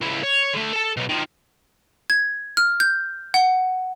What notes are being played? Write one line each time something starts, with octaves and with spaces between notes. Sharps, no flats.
C#2 E4
C#5
D3 A3
A4 A5
B2 F#3
D#3 F3
G#6
F6
G6
F#5